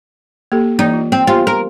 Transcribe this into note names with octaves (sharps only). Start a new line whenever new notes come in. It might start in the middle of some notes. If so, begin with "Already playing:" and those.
A#3 G4 A4
E3 A#3 D#4 D5
F4
C4
B3 F4 G4 C5
A#4